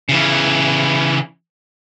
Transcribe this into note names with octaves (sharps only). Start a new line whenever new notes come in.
C#3 E3